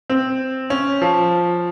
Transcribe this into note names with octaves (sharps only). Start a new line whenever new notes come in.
C4
C#4
F3